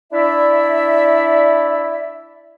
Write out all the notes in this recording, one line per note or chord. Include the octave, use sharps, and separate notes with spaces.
D4 E4 D5 E5